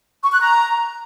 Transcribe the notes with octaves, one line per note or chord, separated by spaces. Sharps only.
C#6
F#6
A#5